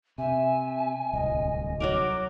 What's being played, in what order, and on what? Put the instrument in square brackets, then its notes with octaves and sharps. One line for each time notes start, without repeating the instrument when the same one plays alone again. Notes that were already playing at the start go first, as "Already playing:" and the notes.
[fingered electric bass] C3 [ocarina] E5 [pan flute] G#5
[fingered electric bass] D1 C2 [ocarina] D#5
[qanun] F#3 F#4 A#4 [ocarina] D6